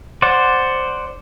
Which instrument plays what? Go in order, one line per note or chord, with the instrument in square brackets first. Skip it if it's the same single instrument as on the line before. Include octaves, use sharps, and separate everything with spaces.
[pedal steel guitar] C5 D5 F#5